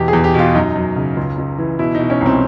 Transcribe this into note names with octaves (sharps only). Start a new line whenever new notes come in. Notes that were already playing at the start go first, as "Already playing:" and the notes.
Already playing: E2 B2 G4
G#4
E2
G4
B2 F4
F#2 D#4
F#2
C#3
C#2
C#2
E3
B2 E4
B2 D#4
C#4
C2
C4